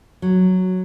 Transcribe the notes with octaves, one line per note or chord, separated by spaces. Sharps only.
F#3